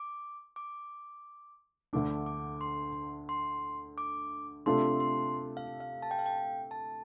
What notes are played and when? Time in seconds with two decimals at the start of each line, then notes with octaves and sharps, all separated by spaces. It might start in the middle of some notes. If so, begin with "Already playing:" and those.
Already playing: D6
0.56 D6
1.93 D2 D3 A3 D4 D6
2.26 D6
2.61 C6
3.29 C6
3.98 D6
4.66 C3 A3 D4 F4 A4 C6
5.00 C6
5.57 F5
5.80 F5
6.02 A5
6.11 G5
6.19 F5
6.26 G5
6.71 A5